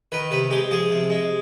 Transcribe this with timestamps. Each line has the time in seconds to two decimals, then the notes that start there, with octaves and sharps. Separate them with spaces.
0.12 D#3 B4
0.31 C3 B4
0.50 G#3 G4
0.71 F3 G#4
0.90 C3
1.10 G#3